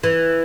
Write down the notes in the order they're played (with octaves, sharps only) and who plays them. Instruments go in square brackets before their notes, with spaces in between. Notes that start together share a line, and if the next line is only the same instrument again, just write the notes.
[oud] E3